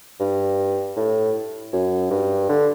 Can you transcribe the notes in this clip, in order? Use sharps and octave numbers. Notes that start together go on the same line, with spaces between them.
G2
A2
F#2
G2
D3